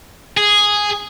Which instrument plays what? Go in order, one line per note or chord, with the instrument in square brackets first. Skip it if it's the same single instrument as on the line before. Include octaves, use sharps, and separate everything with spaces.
[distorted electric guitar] G#4